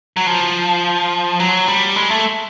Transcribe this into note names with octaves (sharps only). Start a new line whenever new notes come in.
F#3
F3
F#3
G3
G#3
A3